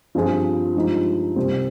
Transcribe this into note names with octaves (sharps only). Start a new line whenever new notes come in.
G2 F3 C4 F4 G#4
G2 F3 G#3 D#4
C2 C3 G3 C4